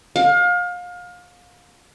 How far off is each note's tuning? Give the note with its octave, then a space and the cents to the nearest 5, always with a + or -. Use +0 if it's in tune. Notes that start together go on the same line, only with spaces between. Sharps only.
F5 +30